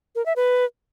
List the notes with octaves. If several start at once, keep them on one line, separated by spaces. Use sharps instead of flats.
A#4
E5
B4